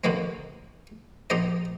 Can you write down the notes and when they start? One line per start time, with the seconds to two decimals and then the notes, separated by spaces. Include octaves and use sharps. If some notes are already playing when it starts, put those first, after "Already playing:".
0.04 D#2 B2 D3 F#3 A#3 C4
1.30 A#1 D#4 G4 C5 D#5